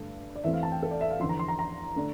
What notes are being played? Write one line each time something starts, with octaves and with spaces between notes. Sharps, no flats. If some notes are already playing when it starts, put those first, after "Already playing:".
Already playing: G2 D3 A3
D5
E2 E3 A3 C4 E5
F5
A5
G5
A4
D5
E5
F5
E2 D3 F3 C6
A#5
C6
A#5
A#5
D3 A3 D4